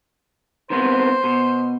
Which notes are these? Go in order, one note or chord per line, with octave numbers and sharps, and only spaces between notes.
D#3 B3 C4 C5
B2